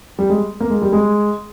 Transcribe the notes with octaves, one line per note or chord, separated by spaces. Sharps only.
G3
G#3
A#3
G#3
G3
G#3